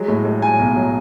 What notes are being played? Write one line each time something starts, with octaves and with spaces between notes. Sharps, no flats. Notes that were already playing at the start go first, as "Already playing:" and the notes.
Already playing: F#3 G#3
A2
A2
F#3 G#5
B1
F#3